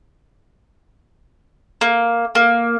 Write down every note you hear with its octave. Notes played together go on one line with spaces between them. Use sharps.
A#3
A#3